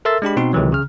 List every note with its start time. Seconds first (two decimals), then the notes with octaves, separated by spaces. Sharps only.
0.05 A4 A#4 E5 C6 E6 A6
0.22 G#3 D4 G4 B5
0.37 B2 C4 D#4 C6
0.53 C#2 C3 D#3 E3 F#3
0.72 C#3 F6